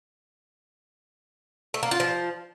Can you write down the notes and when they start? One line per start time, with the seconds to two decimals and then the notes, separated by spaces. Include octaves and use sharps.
1.74 A3
1.83 A#3
1.91 F4
2.00 F3